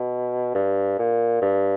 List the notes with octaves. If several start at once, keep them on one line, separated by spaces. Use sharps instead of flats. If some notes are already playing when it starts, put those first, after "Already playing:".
Already playing: B2
G2
A#2
G2